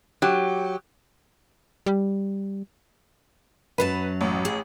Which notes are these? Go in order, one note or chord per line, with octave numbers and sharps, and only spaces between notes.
F#3 G4
G3
F#2 F#3 B4 A5
A1
G#4